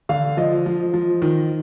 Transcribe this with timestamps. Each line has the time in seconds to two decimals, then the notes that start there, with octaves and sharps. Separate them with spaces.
0.09 D3 F5
0.37 F3 D#5
0.66 F3
0.94 F3
1.22 D#3